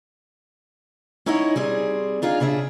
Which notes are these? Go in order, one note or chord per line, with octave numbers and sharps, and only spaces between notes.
C#4 D#4 E4 C#5 D#5 F#5
G3 C4 G#4
D4 D#4 F4 G#4 B4 F5
C#3 D4 G#4 D5 E5